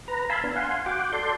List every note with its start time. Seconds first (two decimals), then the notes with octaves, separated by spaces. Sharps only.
0.08 B4 A#5
0.30 F5 G#5 A5 B5 C6 E6
0.44 B3 D4
0.56 F5 F#5 G#5 C6
0.86 F#4 F#5 G5 D6
1.13 A4 D5 C6 G6